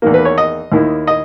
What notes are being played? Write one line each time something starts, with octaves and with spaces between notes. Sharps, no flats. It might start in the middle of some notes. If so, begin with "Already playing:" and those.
E2 D#3 A#3
B4
C#5
D#5
D#2 D#3 A#3 E4
D#5